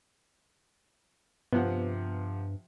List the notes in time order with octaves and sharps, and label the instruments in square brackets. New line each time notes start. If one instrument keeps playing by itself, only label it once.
[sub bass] G2 [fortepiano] C3 F3 F#5 [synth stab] B3